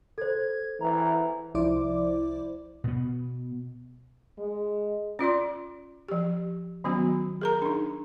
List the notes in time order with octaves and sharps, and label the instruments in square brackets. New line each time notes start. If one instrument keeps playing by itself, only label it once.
[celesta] A4 C5 [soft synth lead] G#6
[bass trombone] E3 [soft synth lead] A#5
[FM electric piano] C2 F3 E4 C5 D5 D6
[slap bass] B2 B3
[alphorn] G#3
[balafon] C#4 F4 D5 C6
F3 G4
D#3 F#3 B3 C#4 F#4
G#4 A#4 A#5
D4 D#4